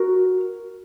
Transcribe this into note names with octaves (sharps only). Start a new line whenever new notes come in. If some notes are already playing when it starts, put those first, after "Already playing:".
Already playing: F#4 A#4